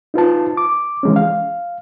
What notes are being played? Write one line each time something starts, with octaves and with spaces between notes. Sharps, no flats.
D#4 F4 B4 A5
D6
E3 G#3 C#4
F5